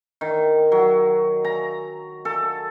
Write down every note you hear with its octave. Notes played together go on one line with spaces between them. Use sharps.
D#3
F#3
A#5
A4